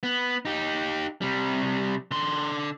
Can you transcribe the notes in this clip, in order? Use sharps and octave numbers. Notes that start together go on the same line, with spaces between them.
B3
D#4 G4
C3 G3
D3 C6